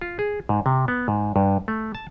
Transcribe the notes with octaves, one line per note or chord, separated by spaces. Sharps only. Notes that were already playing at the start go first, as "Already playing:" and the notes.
F4
G#4
G#2
C3
B3
G#2
G2
A3
A5